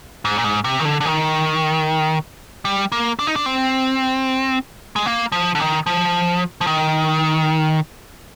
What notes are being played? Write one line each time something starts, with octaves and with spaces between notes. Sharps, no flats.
G#2
A#2
G#2
C3
D#3
D3
D3
D#3
G3
A#3
D4
D#4
D4
C4
G#3
A#3
F3
D3
D#3
F3
F3
D#3